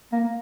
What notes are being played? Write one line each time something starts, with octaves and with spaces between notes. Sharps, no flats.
A#3